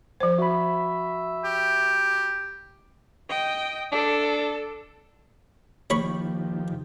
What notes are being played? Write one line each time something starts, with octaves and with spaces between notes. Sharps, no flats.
F3 C5
F#4 E5 B5
G4
D#5 G5
D4 A4
D#3 F3 A#3 G4 C#5 B5 C#6